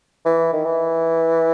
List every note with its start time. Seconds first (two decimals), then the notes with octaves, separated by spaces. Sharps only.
0.26 E3
0.53 D#3
0.65 E3